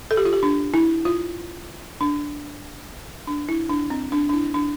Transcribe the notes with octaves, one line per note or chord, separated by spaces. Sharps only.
A4
G4
F4
G4
D4
E4
F4
D4
D4
E4
D4
C4
D4
D4
E4
D4